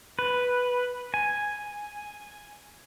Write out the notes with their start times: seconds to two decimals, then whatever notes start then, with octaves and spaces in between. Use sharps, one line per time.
0.19 B4
1.14 G#5